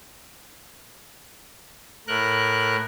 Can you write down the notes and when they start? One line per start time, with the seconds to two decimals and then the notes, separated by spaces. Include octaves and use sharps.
2.07 A2 A#4 F#6